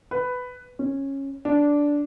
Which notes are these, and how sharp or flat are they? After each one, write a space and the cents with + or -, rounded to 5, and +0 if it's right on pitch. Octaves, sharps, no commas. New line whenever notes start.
B4 +10
C#4 -15
D4 -10